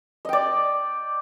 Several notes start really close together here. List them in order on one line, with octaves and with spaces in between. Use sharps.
D#5 G5 D5